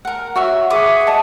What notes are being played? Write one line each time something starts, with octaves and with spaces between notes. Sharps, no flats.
A#4 F#5
F#4 C#5 E5
G#4 B4 E5 F#5 D6 D#6
D#5 A5